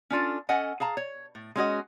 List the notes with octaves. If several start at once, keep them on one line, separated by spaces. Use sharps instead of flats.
C#4 D4 F4 A4
C#4 A4 D#5 F#5 G#5
G#4 F5 A5 A#5
C#5
A2
G#3 C#4 F#4 D#5